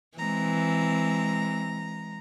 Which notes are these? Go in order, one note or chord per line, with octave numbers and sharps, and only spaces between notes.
E3 G#3 C4 A#5